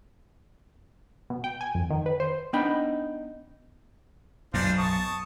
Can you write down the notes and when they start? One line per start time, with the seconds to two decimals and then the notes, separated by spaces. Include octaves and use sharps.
1.30 B2
1.44 G5
1.61 G#5
1.75 F2
1.90 D#3
2.06 B4
2.20 C5
2.53 B3 D4 D#4 G5 B5
4.54 B1 F#2 D4 F4 C5
4.78 A5 C#6 D#6